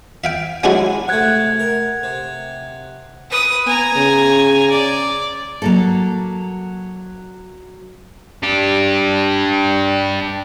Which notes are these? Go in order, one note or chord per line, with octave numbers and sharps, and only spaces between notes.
E5 F5 G5
F#3 G#3 C#4 D4 E4 F#4
C3 A3 F#5 F#6 G#6
A#4
C3
B4 D#6
B3 G#5 A#5
C#3
D5
F#3 A#3 A4
D4 G4